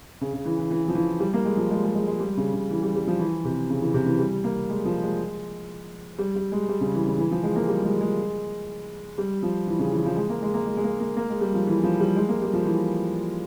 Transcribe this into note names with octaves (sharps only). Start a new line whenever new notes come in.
C#3
C#3
E3
E3
E3
F3
E3
G3
A#3
G#3
F3
G#3
G#3
G#3
G#3
G3
C#3
C#3
E3
G3
G3
F3
E3
C3
C#3
E3
C3
E3
G3
A#3
G#3
F3
G#3
G3
G3
G#3
G3
C#3
E3
C#3
E3
F3
G#3
A#3
G3
G#3
G#3
G3
F3
E3
C#3
E3
F3
G#3
A#3
G#3
A#3
G#3
G#3
A#3
A#3
A#3
G#3
G3
F3
E3
F3
G3
G#3
A#3
G3
F3
E3